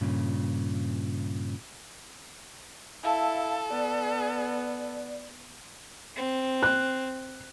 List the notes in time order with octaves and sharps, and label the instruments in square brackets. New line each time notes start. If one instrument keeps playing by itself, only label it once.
[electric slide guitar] G2 A#2 C#3
[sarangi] E4 [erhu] A4 [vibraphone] F5 A5
[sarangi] B3 [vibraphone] D5
[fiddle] C4
[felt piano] F#6